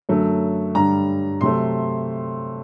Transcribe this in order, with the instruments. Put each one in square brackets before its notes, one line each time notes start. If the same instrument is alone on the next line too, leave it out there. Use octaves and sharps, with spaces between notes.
[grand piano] F#2 D3 F#3 A3
G2 D3 G3 A#5
C3 F#3 A3 C6